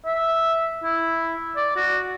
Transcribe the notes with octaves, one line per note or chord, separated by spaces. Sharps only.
E5
E4
D5
F#4